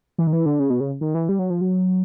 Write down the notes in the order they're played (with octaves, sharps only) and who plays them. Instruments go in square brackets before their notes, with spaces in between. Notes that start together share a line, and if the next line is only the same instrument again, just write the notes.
[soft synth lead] E3
D#3
E3
D3
C#3
B2
C#3
D#3
E3
G3
F#3
F3
F#3